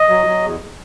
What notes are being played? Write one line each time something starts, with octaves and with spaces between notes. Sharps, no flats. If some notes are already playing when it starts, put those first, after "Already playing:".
Already playing: D#5
F#3
F#3
E2